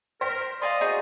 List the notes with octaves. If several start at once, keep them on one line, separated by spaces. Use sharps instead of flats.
A#4 C5 G5 B6
D5 D#5 F5 G#5 C6
D#4 F#4 G#4 D5